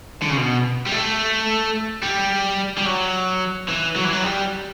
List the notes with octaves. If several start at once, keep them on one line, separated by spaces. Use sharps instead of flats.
D3
C#3
B2
G3
A3
G3
G3
F#3
E3
F#3
E3
F#3
G3